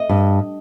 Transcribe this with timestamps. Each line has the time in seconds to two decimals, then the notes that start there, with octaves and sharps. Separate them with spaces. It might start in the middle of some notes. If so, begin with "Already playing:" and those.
Already playing: D#5
0.09 G2